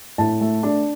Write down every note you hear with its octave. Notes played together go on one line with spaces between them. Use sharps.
A2 A5
A3
D4